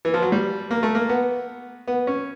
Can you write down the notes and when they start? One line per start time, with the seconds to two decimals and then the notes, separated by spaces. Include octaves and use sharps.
0.05 E3
0.14 F3
0.22 F#3
0.32 G3
0.71 A#3
0.83 A3
0.95 A#3
1.09 B3
1.87 B3
2.07 C#4